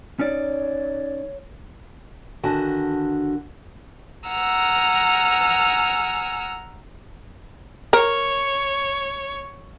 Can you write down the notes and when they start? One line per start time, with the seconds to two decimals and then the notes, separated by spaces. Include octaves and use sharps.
0.19 C#4 D#4 C#5 D5
2.43 D3 D#3 F#4 G#5 A5
4.28 F#5 G#5 A#5 E6 F6
7.93 A#4 C#5